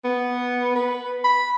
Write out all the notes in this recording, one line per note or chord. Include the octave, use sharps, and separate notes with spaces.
B3
B4
B5